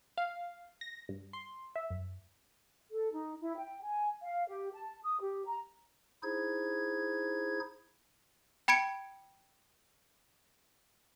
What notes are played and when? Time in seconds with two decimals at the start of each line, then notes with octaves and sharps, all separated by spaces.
0.18 F5
0.81 A#6
1.09 G2
1.33 C6
1.76 E5
1.90 F#2
2.91 A4
3.13 D#4
3.41 E4
3.57 G5
3.82 G#5
4.23 F5
4.48 G4
4.73 A5
5.03 D#6
5.21 G4
5.46 A#5
6.23 D#4 E4 G#4 C5 G#6
8.68 G5 B5 G#6 C#7 D7